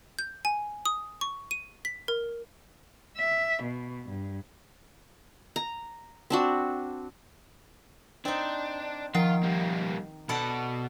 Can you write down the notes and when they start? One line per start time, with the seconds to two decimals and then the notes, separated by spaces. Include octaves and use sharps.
0.19 G6
0.45 G#5
0.86 D#6
1.21 C#6
1.51 D#7
1.85 B6
2.08 A#4
3.18 E5
3.63 B2
4.08 G2
5.56 A#5
6.30 C4 D4 F#4
8.25 C4 D4 D#4
9.14 D#3 F3 F4 F#5 C7
9.43 G3 A#3
10.29 B2 A4 D5 F#5 B5